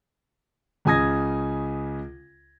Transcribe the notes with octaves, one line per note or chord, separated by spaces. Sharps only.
C#2 C#3 G#5 D#6 G#6 A#6